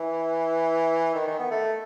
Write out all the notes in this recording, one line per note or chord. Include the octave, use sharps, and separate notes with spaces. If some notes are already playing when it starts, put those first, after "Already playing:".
Already playing: E3
D#3
D#3
B3
A3